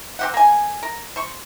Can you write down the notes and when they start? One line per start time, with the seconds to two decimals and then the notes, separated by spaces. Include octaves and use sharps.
0.19 C4 G4 F#5
0.34 A#3 G#5
0.83 A#4
1.16 C5 C#6